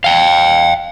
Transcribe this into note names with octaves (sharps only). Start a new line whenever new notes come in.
F5 G5